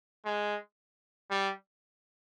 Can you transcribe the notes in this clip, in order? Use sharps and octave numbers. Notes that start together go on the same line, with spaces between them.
G#3
G3